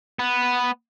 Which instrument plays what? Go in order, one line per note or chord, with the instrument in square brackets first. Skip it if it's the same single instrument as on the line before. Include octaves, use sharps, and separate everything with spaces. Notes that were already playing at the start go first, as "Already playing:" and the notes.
[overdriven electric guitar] B3